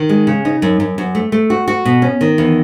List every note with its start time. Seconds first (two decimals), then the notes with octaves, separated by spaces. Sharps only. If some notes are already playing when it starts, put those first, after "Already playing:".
Already playing: D#3
0.09 G#3
0.27 C#3
0.45 D#4
0.62 F#2
0.80 F#2
0.98 F#2
1.15 A3
1.32 A3
1.50 F#4
1.68 F#4
1.85 B2
2.02 C#4
2.21 D#3
2.38 E2